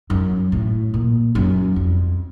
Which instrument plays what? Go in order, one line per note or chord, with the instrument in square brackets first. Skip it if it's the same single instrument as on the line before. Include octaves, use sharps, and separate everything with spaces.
[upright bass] F#2
A2
A#2
F#2
F2